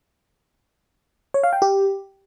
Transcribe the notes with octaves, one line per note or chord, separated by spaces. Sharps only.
C#5
F5
G5
G4